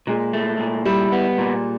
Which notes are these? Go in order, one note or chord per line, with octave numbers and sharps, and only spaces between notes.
A#2 G#3
A3
A#2
G3 E4
B3
A#2